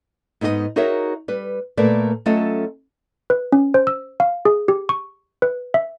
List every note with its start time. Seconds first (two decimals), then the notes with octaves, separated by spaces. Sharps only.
0.41 G#2 B3 D#4 G4 D#5
0.76 D#4 F#4 G#4 A#4 C#5 E5
1.28 G3 B4
1.77 A#2 A3 A#3 A#4 B4 D5
2.26 F#3 A3 C#4 F4 A4 D#5
3.30 B4
3.52 C#4
3.74 C5
3.87 E6
4.20 F5
4.45 G#4
4.68 G4
4.89 C#6
5.42 B4
5.74 E5